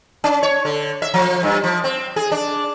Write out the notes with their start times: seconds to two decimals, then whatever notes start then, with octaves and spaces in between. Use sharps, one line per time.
0.24 C#4
0.43 C#5
0.65 D3
1.02 E5
1.14 F3
1.43 G2
1.64 F3
1.84 C4
2.16 G#4
2.32 D4